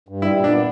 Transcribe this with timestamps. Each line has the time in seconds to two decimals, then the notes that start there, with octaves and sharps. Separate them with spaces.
0.08 G2
0.22 G3 E4
0.37 A#2
0.44 D4
0.51 B3